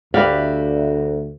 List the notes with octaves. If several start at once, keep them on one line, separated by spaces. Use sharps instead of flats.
D2 F#4 G4 B4 D5 E5 F5